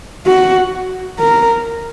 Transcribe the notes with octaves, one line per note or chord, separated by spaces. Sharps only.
F#4
A#4